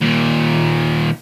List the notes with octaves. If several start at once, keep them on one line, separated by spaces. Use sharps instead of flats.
D#2 A#2